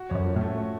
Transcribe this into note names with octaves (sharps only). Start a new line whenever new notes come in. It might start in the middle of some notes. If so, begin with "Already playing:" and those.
Already playing: F#4
F2 C#4
F#2
F3
A2
A3
F#4